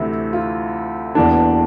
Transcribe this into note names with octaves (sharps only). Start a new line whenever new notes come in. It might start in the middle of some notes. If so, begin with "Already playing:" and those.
Already playing: D2 C3 E3 E4
F4
E1 E2 E3 A#3 D4